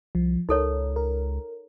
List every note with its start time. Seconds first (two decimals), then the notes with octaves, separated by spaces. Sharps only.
0.15 C2 F3
0.49 C#2 D#4 A4 A#4 C#5
0.96 A#4